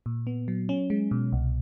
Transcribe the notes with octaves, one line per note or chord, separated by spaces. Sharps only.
A#2
B3
F#3
C#4
G#3
B2
C2